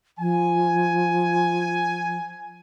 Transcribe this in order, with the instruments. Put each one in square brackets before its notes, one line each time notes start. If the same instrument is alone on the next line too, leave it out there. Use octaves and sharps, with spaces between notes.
[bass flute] F3 [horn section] G#5